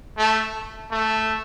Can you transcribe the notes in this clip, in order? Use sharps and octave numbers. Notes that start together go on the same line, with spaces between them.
A3
A3